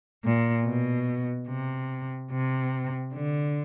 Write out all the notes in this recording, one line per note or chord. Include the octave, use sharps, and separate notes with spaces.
A#2
B2
C3
C3
D3